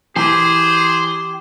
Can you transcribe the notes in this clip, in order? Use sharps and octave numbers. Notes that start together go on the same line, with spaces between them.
E3 G4 G#4 C5